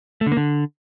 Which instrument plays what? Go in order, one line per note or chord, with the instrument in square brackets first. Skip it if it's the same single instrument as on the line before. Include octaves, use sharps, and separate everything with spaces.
[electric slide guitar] A3
D3
A#3
D3